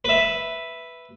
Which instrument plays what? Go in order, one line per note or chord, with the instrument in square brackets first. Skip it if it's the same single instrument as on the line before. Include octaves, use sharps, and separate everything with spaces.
[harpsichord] B4 E5